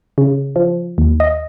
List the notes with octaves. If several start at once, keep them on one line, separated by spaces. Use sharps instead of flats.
C#3
F3
D#2
D#5